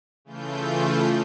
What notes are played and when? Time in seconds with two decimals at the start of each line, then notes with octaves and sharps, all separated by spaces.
0.25 C#3 E3 A3 F4 G6